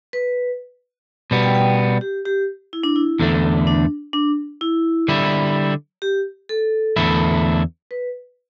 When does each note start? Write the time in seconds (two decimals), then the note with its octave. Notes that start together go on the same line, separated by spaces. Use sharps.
0.13 B4
1.31 B2 G3 B3
1.43 G5
1.55 G5
2.01 G4
2.26 G4
2.73 E4
2.83 D4
2.96 E4
3.19 E2 D3 A3
3.67 D4
4.13 D4
4.61 E4
5.08 D3 G3 E4
6.02 G4
6.49 A4
6.96 E2 D3 A3 E4
7.91 B4